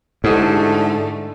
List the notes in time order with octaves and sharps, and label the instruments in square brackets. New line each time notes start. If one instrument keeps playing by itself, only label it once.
[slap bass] G#2 [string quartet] D3 A3 [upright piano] E4 G4 A4